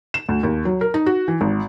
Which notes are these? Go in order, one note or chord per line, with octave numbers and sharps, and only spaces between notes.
E7
D2
D#2
F#3
A#4
D#4
F#4
E3
G#1